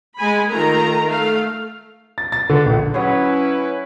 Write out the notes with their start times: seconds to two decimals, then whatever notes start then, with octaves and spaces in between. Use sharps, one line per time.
0.17 G#3 G#5 B5
0.50 D#3 A3 F4 A#4 A#5
1.06 A3 F5
2.18 A6
2.32 A6
2.49 D3
2.66 A#1
2.94 F#3 C#4 E4 G#4 B4